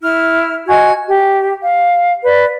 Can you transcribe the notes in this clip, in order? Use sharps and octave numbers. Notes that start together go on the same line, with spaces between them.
E4 F6
F#4 D#5 G#5 G#6
G4
F5
B4 D5